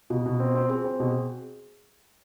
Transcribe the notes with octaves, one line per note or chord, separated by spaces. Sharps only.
B2 F4
B2
C4
C4
C4 G#4
C4
B2